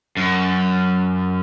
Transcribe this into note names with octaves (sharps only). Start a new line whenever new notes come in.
F#2